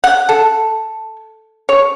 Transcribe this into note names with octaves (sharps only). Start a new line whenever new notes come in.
F#5
A4
C#5